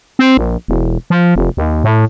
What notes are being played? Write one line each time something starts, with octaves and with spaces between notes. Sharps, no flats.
C4
A#1
E1
F3
F1
D#2
A2